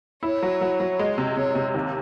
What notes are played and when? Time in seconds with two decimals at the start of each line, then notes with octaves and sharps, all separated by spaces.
0.22 E4 C#5
0.42 F#3
0.61 F#3
0.80 F#3
0.99 G#3
1.18 C3
1.36 C3 C#5
1.55 C3
1.74 D#2